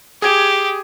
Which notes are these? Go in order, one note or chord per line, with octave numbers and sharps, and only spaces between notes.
G4 G#4 G#6